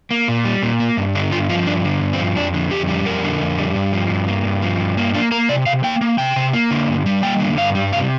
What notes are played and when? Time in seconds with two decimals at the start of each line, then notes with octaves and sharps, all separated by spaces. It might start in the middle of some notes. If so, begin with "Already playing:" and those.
0.11 A#3
0.28 A#2
0.45 G3
0.63 A#2
0.80 A#3
0.97 G2
1.15 D3 D4
1.32 G2 F4
1.49 F3 F4
1.66 G2 D4
1.84 D3
2.01 G2
2.13 C4
2.19 F3
2.36 F2 D4
2.54 D3
2.71 F2 G4
2.88 G3
3.06 F2 A#4
3.23 D3
3.41 F2
3.58 G3
3.76 G2
3.93 F3
4.10 G2
4.28 A#3
4.45 G2
4.62 F3
4.80 G2
4.97 A#3
5.14 A#3 D4
5.32 A#3 A#4
5.49 C3 D5
5.66 C3 F5
5.84 A#3 G5
6.01 A#3
6.18 C3 G5
6.36 C3
6.53 A#3
6.71 D3
6.88 G2
7.06 G3
7.23 A#3 G5
7.40 D3
7.57 G2 F5
7.75 G3
7.92 C3 F5